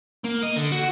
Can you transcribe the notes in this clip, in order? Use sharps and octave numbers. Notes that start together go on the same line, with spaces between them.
A#3
D#5
D3
F#4